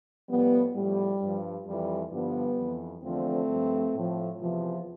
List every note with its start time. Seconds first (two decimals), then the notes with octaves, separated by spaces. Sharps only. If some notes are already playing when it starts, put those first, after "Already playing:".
0.29 A2 F3 G3 B3
0.75 A2 F3 G3
1.20 G2 F3
1.66 F2 E3 G3
2.11 G2 D3 F3 G3 B3
2.57 F2 E3
3.03 E2 D3 F3 A3 C4
3.48 G2 F3
3.94 A2 F3
4.40 E2 C3 E3 F3